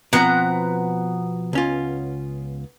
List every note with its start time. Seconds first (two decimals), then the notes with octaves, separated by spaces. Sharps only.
0.13 B2 F3 B3 C4 A#5 F#6
1.53 C#2 C#4 F4